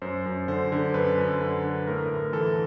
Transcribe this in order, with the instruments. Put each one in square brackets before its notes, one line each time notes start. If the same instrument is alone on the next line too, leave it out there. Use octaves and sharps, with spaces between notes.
[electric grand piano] F#2 C5
F#2
D3 C5
D3
F#2 B4
F#2
D3
D3
A2 A#4
A2
E3 A4